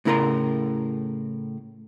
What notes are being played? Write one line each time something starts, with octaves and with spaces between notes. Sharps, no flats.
A2 C#3 E4 A#4 A#5 C6